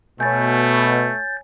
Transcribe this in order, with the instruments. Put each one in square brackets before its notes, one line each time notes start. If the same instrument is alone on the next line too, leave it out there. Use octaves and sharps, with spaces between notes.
[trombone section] B2 [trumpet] A3 [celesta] C#5 G#5 [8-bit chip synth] G6 A6